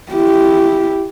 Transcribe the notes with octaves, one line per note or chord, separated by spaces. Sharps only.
E4 G4